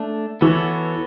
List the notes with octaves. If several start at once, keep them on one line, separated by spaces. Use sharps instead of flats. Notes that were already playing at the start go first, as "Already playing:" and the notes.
Already playing: A3 D4
E3 B3 F#4 A4 C#5